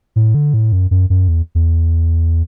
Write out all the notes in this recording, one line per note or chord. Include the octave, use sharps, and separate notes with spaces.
A2
D3
A2
F#2
F#2
F#2
E2
E2